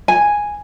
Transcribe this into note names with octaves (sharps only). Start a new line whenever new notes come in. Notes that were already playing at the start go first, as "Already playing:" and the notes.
G#5